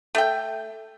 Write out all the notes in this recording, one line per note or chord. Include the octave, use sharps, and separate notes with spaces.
A3 G5